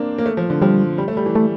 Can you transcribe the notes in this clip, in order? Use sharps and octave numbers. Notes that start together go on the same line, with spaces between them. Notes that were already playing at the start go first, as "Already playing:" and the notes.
Already playing: A#3 C4 D4
A#3
A3
F3
D3
F3 G3
G3
A3
G3
E3
A3